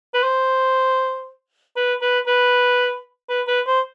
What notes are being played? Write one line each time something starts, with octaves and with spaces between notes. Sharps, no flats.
B4
C5
B4
B4
B4
B4
B4
C5